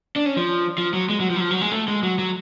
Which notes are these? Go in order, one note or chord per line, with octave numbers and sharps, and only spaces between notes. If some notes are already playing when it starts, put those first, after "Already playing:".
D4
C#4
F3
F3
F#3
G#3
F#3
F3
F#3
F3
F#3
G#3
A3
G#3
F#3
F#3